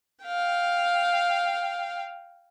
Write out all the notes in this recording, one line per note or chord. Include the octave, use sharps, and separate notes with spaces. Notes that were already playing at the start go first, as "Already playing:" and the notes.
F5 G5